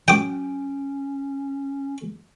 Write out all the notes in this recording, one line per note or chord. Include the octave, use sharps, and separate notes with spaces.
F#3 C#4 G5 D6